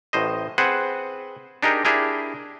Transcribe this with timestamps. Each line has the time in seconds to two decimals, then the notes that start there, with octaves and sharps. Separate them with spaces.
0.13 A1 A2 C5 D#5
0.58 C4 G#4 B4 C5 F#5
1.63 D4 D#4 G4 G#4 A#4
1.85 D4 E4 G4 G#4 A#4